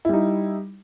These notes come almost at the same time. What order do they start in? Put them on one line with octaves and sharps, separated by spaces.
E4 G3 D#4